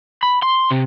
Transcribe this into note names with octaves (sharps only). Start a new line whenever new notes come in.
B5
C6
C3